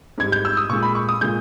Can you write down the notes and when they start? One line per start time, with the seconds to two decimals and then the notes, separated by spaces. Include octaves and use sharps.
0.18 G#2 G3 G#6
0.32 G6
0.45 E6
0.57 D#6
0.69 A#2 C#6
0.73 G#3
0.83 B5
0.95 C#6
1.09 D#6
1.21 A#2 G#3 G6